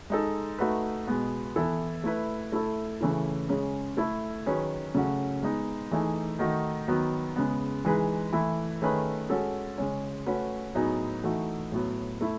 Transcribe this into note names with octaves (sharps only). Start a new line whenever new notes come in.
G#3 D#4 A4
A3 D#4 F#4 B4
B2 G#3 B3
E3 B3 E4 A4
A3 E4 B4
A3 E4 A4
C#3 E3 A3 C#4 E4
C#3 G#3 C#4
A3 E4 A4
D#3 F#3 C#4 G#4 B4
C#3 F#3 A3 C#4 F#4
G#3 B3 D#4
E3 A3 D#4 G#4
D#3 A3 D#4 F#4
D#3 F#3 B3
C#3 G#3 B3
E3 G#3 D#4 G#4 B4
E3 A3 E4
D#3 A3 C#4 G#4 B4
G#3 C#4 F#4 A4
C#3 G#3 C#4
A3 C#4 F#4 B4
A2 F#3 B3 D#4 G#4
E3 A3 D#4 F#4
A2 F#3 B3
A3 E4